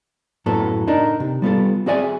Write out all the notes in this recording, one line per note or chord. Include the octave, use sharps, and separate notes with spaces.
F#2 A2 F#3 B3 A4
D4 D#4 A#4
C3
G3 B3 F4 A4
C4 F#4 G#4 D5 E5 G#5